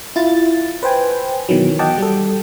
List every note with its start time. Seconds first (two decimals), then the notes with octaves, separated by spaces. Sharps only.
0.16 E4 F4 A6
0.83 B4 C5 G5 G#5
1.49 B2 D#3 E3 F#3
1.79 D#5 F#5 G5 A5 D6
1.98 G3 A4